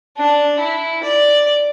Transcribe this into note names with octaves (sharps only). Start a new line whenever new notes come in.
D4
E4
D5